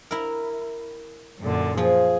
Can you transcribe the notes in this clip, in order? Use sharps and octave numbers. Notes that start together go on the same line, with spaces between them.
E4 A#4
F#2 A#2 D3
F3 G#4